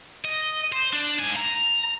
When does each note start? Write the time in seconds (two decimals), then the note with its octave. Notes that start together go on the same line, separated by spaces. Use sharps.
0.25 D#5
0.72 C5
0.93 D4
1.19 G#2 G#5
1.36 A#5